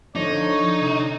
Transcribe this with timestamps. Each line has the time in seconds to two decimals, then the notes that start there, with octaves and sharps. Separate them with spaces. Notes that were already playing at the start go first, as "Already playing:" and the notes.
0.15 D3 F3 D#4 C#5
0.81 C3